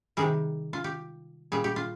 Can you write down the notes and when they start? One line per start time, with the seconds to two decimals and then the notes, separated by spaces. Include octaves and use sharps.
0.17 C3 D#3 G3 G#4
0.73 F4
0.84 G4
1.52 A#2 G3 G#4
1.64 G4
1.76 F4